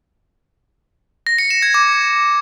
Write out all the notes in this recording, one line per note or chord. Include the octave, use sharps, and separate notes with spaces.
A#6
C#7
E7
G#6
D6